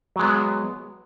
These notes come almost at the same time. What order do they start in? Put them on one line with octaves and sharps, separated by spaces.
F#3 G#3 B3